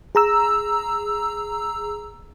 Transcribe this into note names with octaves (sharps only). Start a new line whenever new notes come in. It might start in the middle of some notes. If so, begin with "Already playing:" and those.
G#4 A#5 E6